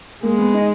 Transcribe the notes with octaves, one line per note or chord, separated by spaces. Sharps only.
G#3 A#3
B3
D#4